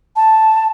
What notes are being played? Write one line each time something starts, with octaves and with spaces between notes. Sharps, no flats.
A5